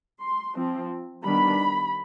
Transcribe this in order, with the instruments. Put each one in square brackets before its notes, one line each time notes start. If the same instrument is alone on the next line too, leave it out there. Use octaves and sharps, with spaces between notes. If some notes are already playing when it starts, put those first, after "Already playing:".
[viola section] C6
F3 C4
D#3 G3 B3 D4 B5